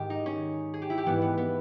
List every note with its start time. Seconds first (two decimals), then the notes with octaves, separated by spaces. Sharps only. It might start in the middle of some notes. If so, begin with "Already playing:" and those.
Already playing: G#2 D#3 G4
0.10 D#4
0.26 C#4
0.74 G#4
0.82 G4
0.90 E4
0.98 G4
1.06 G#2 E3 B3
1.22 B3
1.38 B3